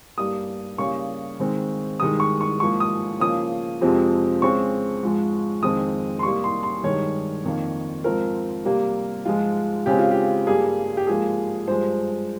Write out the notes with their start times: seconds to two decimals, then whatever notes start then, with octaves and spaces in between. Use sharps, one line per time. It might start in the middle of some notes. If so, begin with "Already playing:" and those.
0.18 G2 G3 A#3 D#6
0.78 C#3 G3 A#3 C#6
1.39 G#2 D#3 G#3 C4
2.00 G2 D#3 G#3 D#6
2.20 C#6
2.41 C#6
2.60 G#2 F3 A#3 C#6
2.80 D#6
3.20 C#3 F3 A#3 D#6
3.81 F2 C3 F3 G#3 C4
4.42 C#3 G#3 C4 C#6
5.03 G#2 F3 G#3
5.63 F2 D#3 G#3 C4 D#6
6.19 C6
6.23 C3 G3 A#3 C#6
6.44 C6
6.63 C6
6.84 G2 D#3 G#3 C#5
7.44 F2 D#3 A#3
8.04 G#2 F3 C4 A#4
8.65 C3 G3 A#3
9.25 G#2 F3 G#3 F4
9.86 C#3 G#3 C4 G4
9.99 F4
10.11 G4
10.47 G2 G3 A#3 G#4
10.97 G4
11.07 G#2 F3 A#3 G#4
11.67 G2 F3 G#3 C5